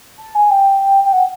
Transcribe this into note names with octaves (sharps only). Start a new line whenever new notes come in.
A5
G#5
G5
G5
F#5